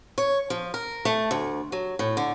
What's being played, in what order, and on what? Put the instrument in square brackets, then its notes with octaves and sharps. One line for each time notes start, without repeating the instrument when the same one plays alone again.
[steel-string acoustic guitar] C#5
F3
A#4
A3
D2
F#3
A2
D3